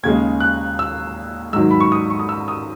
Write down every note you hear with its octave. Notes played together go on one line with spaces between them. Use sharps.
D#2 C#3 G#3 G#6
F#6
E6
G#2 D#3 F#3 E6
B5
C#6
D#6
C#6
D#6
E6
D#6